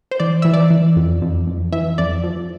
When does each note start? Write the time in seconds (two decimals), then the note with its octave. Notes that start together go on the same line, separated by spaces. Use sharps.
0.11 C5
0.20 E3 D5
0.42 E3 E5
0.54 D5
0.70 E3
0.96 F2
1.22 F2
1.47 F2
1.73 E3 E5
1.98 F2 D5
2.24 F3